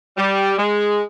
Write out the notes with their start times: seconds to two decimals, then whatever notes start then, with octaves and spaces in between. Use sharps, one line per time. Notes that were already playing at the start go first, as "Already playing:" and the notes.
0.17 G3
0.58 G#3